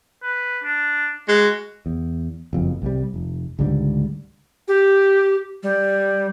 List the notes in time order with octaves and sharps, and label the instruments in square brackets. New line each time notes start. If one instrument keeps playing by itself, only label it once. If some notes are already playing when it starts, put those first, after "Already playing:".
[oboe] B4
D4
[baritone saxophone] G#3 [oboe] F#4
[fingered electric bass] E2
F#1 F2
C2 C3 G3
F1
C#2 G#2 D3 G3
[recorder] G4
G3